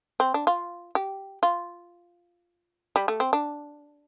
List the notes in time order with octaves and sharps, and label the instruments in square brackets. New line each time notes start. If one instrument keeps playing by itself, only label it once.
[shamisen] C4
D4
F4
G4
F4
G3
A3
C4
D4